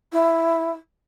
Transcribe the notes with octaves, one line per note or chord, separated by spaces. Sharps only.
E4